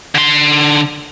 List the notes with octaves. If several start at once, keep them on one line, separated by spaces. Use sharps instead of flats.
D3 C6